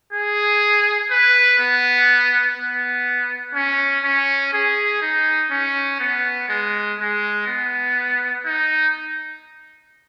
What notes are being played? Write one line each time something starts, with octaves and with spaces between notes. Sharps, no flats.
G#4
B4
B3
B3
C#4
C#4
G#4
D#4
C#4
B3
G#3
G#3
B3
D#4